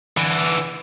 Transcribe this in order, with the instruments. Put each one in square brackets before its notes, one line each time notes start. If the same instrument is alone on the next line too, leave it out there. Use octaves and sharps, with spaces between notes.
[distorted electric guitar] D3 E3